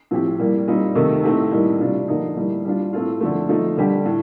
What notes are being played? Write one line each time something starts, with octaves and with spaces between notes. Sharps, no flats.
A2 F3 C4 G4
A2 G3 A#3
A#2 G3 C4 D#4
C3 D#3 A3 D#4
A2 A3 C4 D#4 G4
A2 G3 A#3 D#4
C3 G3 D4 F4
D3 F3 A#3 D#4
A2 G3 A#3
G3 D4 F4
A2 A3 C4 F4
D3 F3 A3
F3 A3 D#4
D3 G3 D4 G4
A2